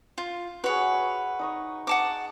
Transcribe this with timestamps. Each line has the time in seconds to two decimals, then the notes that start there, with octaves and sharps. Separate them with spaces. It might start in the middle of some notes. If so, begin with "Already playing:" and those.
0.18 F4
0.64 F#4 G#4 B4 C#5
0.94 E5
1.39 D#4 D#5 C#6
1.87 F#5 A5 D6